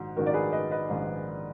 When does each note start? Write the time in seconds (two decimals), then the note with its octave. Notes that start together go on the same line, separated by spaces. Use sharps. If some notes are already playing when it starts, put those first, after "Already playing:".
Already playing: A#1 G#2 D#3 D#4 F#4
0.17 A#1 G#2 D#3 F#4 A#4
0.26 D5
0.34 G#4 B4
0.52 B4 D#5
0.71 B4 D#5
0.89 A#1 G#2 D#3